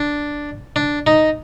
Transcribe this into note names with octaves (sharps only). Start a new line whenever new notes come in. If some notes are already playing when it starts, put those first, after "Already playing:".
Already playing: D4
D4
D#4